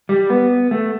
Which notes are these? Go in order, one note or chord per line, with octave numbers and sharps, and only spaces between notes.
G3
B3
A3